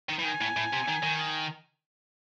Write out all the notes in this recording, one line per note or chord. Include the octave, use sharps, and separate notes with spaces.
D#3
E3
D#3 G#5
A2
A2
C3
D#3
D#3